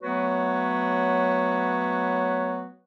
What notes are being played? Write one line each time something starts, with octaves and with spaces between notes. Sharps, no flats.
F#3 A3 B3 F#4 B4 C#5